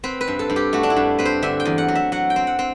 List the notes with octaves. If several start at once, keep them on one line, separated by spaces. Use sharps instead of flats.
C4 B4
B4
G2
A4
G2
G4
A3 F#4
D4
E4
G2
C4 B4
C5
D3 E5
G5
E2
F#5
F#3
E5
F#3 F#5
G5
C4
F#5
C4